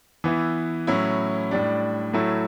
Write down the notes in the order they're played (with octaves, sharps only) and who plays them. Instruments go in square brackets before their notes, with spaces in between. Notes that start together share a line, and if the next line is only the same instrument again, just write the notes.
[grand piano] E3 B3 E4
A2 F#3 C#4 E4
A2 G3 D4
A2 F#3 A3 E4